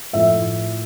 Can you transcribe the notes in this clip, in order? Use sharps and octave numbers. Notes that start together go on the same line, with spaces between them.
A2 F3 A3 E5